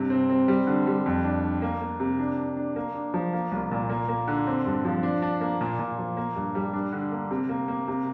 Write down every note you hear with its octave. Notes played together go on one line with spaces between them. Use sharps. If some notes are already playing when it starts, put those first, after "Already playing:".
Already playing: G2 C3
C4
C4
G3
D3
G3
F2
D4
D4
A#3
A#3
C3
D4
D4
D4
A#3
D4
F3
A#3
C2
A#2
A#3
A#3
D3
C4
G2
F3
D4
D4
A#3
A#2
A#2
F3
A#3
G2
G3
D4
D3
A#3
C3
A#3
A#3
C3